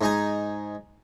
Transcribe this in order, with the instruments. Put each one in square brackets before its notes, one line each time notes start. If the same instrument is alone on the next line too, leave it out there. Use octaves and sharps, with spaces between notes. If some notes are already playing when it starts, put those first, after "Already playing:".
[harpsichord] G#2 D#4 G#5